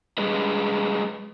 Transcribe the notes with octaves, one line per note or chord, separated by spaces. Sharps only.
G3 G#3 G#4 B4 D#5